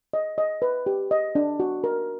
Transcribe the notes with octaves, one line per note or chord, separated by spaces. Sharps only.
D#5
D#5
B4
G4
D#5
D4
F#4
A#4